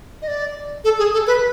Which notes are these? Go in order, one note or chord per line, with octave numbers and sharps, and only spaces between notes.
D#5
D5
A4
G#4
A4
B4